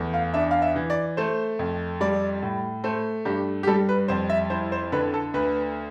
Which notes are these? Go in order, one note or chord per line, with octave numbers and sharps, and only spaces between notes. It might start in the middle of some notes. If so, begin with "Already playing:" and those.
Already playing: E2 A3
F5
D4 E5
F5
E5
E3
D5
A3 C5
F2
G3 D5
A2
A3 C5
G2 G4
G4
G3 A4
B4
F2 C5
E5
E4 C5
C5
D3 B4
A4
D2 B4